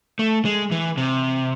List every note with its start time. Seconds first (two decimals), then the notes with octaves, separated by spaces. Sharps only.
0.19 A3
0.45 G#3
0.72 E3
0.98 C3